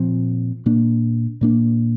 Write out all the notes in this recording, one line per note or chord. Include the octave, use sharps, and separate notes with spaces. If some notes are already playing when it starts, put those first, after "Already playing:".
Already playing: A#2 F3 C4
A#2 A#3 D4
A#2 A#3 D4